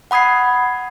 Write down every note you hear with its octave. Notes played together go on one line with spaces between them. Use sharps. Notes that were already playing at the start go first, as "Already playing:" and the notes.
F#5 B5 D#6 G#6 C7